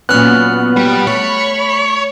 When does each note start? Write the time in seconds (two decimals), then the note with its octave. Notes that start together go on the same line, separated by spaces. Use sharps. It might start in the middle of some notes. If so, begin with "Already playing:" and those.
0.09 A#2 F#3 B3 C#4 F6 F#6
0.77 G3
1.07 A3 C#5 B5